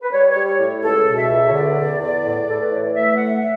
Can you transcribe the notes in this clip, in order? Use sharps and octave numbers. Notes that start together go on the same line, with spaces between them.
B4
G3 C#5
C#5
G3
C#5
A2
C#2 A4
B2
E5
C#2
C#5
D3 D5
E2
E2
A2
A2 A4
B4
E3 C#5
D5
A3 E5
A2 F#5
E5